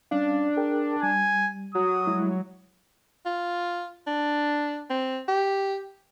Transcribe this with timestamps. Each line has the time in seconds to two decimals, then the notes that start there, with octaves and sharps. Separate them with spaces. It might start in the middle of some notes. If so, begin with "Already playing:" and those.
0.11 G3 C#4 D4 F5
0.57 G#4 A#4 G5
1.03 G3 G#5
1.75 F#3 D#6
2.07 G3 G#3 E4
3.26 F4
4.07 D4
4.90 C4
5.28 G4